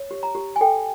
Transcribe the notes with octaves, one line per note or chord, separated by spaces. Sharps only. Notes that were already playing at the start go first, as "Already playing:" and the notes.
Already playing: C#5
G4
A#5
G4
G#5
A4 G5